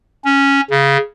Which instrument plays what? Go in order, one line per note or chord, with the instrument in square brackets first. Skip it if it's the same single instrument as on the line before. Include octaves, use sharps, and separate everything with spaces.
[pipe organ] C#4
C#3